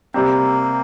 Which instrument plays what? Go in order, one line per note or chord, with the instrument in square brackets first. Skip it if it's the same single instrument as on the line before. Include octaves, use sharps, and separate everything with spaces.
[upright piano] C3 G3 C4 [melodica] A#3